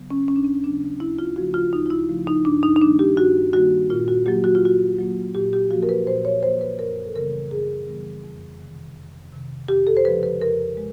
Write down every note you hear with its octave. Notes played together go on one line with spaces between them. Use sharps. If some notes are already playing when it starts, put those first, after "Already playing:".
Already playing: C#3 F#3 B3
C#4
D#2 C#4
D4
C#4
C#3 F#3 B3 D4
D2 E4
F4
C#3 F3 A3 F#4
F4
D2 D#4
F4
E4
C#3 F3 A3
D#4
G2 D4
D#4
D#4
D#3 G3 A#3 D4
G4
G2 F#4
D#3 G3 A#3 F#4
A#2 F4
F#4
F#3 A#3 G4
F#4
F4
A#2 F#4
F#3 A#3
A#2 G4
G4
F3 A#3 F#4
A#4
B4
A#2 C5
C#5
F3 A#3 C5
B4
F#2 A#4
A4
C#3 E3 G3 B3 A#4
F#2 G#4
C#3 E3 G3 B3
F2
C3 D#3
F2
C3 D#3
F2 G4
A4
C5
C#3 F3 G#3 B4
B4
F2 A#4
G#3